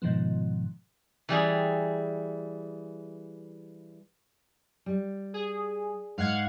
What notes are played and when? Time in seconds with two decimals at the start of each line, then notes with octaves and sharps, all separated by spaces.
0.02 G#2 B2 D#3 F3 B3
1.29 E3 G3 G#4
4.86 G3
5.34 G#4
6.18 G#2 F5 F#5 G#6